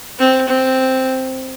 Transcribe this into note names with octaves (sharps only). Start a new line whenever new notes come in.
C4
C4